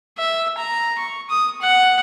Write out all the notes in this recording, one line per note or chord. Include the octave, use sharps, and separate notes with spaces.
E5
A#5
C#6
D#6
F#5